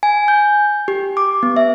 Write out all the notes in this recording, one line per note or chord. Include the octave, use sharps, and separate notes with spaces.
G#5
G6
G4
D6
B3
E5